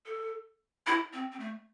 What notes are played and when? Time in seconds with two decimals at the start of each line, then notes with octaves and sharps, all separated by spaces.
0.06 A4
0.87 E4
1.13 C4
1.32 C4
1.39 A3